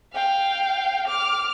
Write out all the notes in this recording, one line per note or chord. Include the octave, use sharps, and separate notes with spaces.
F5 G5
D6 F6